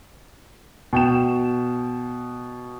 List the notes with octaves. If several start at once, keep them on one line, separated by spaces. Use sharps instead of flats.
B2 G5 E7